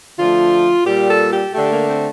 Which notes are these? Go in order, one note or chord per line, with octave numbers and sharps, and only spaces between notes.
D3 F3 A3 F4
A#2 G3 G4
A4
G4
D3 A3 G4
A#3
C4